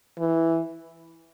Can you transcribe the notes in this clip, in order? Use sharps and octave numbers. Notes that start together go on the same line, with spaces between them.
E3